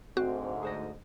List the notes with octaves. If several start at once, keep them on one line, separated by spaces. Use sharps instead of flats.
D2 G#2 C4 F#4
G#4 C5 D#5